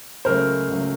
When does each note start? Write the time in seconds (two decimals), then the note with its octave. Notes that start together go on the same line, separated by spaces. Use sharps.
0.25 C#2 C#3 F#3 A3 A#4 C5
0.69 C#2 C#3 F#3 A3